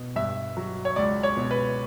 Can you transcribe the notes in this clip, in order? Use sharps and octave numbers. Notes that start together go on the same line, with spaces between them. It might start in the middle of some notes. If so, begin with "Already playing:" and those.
Already playing: B2
G2 E5
F#3
C#5
C#2 D5
C#5
B2
B4